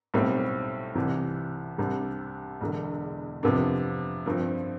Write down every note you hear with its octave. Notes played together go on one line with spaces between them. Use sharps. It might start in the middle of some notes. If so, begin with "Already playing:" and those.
B1 A2 G3 C4
C2 C3 E3
C2 C3 G3 D4
E1 E2 D3
F2 C3 F3 B3 D4
G2 F3 C4